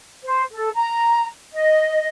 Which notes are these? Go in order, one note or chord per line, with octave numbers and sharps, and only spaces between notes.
C5
A4
A#5
D#5